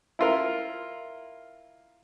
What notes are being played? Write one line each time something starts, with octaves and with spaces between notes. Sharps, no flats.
E4 F4 A#4